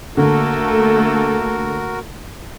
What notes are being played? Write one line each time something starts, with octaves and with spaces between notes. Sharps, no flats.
D3 A3 A#3 F#4 A4 A#4